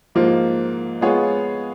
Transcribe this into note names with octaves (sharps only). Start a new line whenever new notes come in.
G#2 F3 A#3 F4
G#3 B3 F4 G#4 C#5